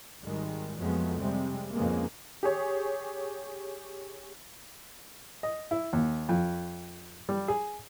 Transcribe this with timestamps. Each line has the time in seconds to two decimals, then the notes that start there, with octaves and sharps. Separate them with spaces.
0.22 G#1 D#3 G3 G#3
0.77 F2 F3 F#3 G#3 A3 B3
1.20 C3 G3 G#3 C4
1.74 F2 G#2 C#3 G#3 A#3 B3
2.43 G4 G#4 C#5
5.43 D#5
5.71 E4
5.93 D#2
6.29 F2
7.29 G3
7.48 G#4